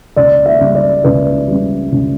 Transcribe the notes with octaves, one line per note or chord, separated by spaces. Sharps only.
C#2 D5
E5
C#3 G3
D5
C#2 B4
C#3 G3
C#2